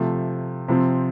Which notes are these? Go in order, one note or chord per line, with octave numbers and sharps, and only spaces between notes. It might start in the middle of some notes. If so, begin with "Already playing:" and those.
Already playing: C3 F3 A3
C3 F3 C4